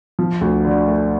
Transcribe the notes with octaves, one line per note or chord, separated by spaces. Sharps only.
F3
D2
D3
A3